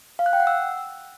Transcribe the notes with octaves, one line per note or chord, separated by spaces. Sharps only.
F5
F#6
G5
F#5
E6